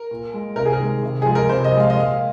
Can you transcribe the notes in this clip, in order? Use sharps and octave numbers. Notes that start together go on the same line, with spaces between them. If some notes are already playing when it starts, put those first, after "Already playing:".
Already playing: A#4
A#2
G#3
C3 A#4
G#4
A#4
D#3 G#3
C3
F3 G#3 G#4
A#4
C3 C5
D#5
F3
G#3 F5
D#5
A#2 F5